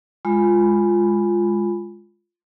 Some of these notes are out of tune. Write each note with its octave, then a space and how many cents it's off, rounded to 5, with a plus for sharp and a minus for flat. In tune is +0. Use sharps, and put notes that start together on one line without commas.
G#3 -5 F4 +0 B5 +0